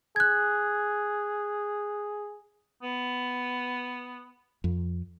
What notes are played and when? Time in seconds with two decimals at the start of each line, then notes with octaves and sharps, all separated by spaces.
0.16 G#4 F#6 G#6
2.83 B3
4.64 F2